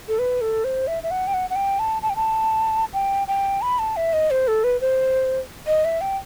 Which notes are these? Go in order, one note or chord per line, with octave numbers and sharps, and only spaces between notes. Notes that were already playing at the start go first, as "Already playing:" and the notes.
A4
B4
A4
C5
E5
E5
F#5
G5
F#5
F#5
G5
A5
A5
G5
A5
G5
G5
B5
A5
E5
D#5
C5
A4
B4
C5
D#5
E5
G5